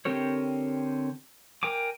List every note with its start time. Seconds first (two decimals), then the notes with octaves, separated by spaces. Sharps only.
0.05 D3 C4 G4 A#4 C#5
1.63 A#4 G5 G#5 D6